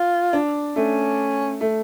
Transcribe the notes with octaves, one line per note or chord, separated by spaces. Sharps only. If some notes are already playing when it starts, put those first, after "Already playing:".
Already playing: F4
D4
A3 C#4
A3